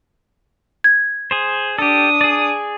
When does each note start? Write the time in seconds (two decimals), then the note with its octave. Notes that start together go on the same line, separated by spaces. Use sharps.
0.84 G#6
1.31 G#4 C5
1.79 D4 G4 A4 D#6
2.21 G#4 D5